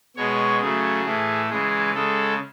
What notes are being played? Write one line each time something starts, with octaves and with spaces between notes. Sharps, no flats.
B2 G#3 C#5
C#3 F#3 A3 G#4
A2 E3 A3
C#3 E3 G#3 G#4
C#3 G#3 A4